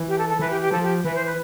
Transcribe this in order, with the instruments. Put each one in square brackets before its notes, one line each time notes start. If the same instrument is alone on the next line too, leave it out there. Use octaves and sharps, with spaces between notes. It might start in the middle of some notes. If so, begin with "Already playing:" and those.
Already playing: [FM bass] E3
[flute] G4
A4
A4
[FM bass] E3 [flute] B4
[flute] G4
G4
[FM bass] F3 [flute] A4
[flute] G4
[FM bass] E3 [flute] B4
[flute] C5
B4